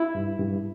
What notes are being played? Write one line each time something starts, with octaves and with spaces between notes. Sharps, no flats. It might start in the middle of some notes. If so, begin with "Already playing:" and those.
Already playing: E4
G2
G2